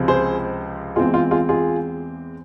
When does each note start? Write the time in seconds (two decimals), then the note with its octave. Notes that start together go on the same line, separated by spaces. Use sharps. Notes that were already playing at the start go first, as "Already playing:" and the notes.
Already playing: C#2 C3 F3 G#3 C4
0.08 G#4 C5
0.96 E2 E3 G#3 C4 F4 G#4
1.14 F4
1.31 F4 G#4
1.49 F4 G#4